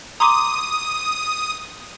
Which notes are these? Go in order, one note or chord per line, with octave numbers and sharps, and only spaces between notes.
A#5 C6 D6 D#6